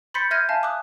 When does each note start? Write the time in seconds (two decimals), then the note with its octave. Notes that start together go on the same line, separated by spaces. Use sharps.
0.14 B5 C6 G6 A6 B6 C#7
0.31 E5 F6 G6 G#6 A#6 D#7
0.49 E5 F5 G#5 A5
0.63 D6 D#6 F#6